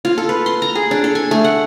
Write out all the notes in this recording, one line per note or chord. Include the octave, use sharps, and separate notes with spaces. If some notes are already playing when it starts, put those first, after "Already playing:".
F4
A4
B4
C6
A#5
G#4
D4
A4
G#5
A3
F#5